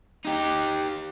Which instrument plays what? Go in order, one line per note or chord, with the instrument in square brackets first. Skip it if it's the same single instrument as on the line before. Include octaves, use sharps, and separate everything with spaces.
[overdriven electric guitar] D#4 G4